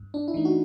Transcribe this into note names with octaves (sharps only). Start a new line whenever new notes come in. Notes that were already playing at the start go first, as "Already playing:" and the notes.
Already playing: G2
D4
E4
E3 A3 D#4
F#4